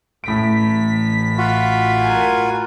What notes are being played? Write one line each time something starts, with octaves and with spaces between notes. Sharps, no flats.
A1 A2 B6 D7
F4 F#4
A#4 G#5